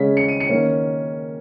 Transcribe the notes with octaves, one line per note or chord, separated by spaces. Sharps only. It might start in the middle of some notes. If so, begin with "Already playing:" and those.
Already playing: C#3 G#3 C#4 B6
C#7
D#7
C#7
D#3 A#3 C#4